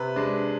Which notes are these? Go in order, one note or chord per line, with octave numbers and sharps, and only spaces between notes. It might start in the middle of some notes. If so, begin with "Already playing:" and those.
Already playing: C3 B4
G#3 D4